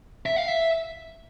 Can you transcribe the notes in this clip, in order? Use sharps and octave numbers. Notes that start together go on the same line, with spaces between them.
E5
F5
E5